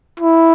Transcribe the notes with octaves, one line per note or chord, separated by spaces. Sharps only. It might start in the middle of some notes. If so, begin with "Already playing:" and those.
E4